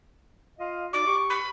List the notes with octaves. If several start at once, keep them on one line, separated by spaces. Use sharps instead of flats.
F4 D#5 F5
D#4 F#4 D5 D6
G4 C#6
B5